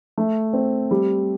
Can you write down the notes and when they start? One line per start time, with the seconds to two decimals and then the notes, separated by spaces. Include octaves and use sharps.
0.18 A3
0.53 C4
0.91 G3